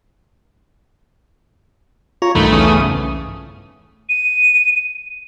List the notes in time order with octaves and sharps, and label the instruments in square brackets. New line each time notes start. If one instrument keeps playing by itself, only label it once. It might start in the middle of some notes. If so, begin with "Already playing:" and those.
[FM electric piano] F4 [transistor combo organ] C#5 A#5
[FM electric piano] B1 G2 [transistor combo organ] D#3 B5 [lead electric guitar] A3
[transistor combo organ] E2 C#3 D#6
[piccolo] D#7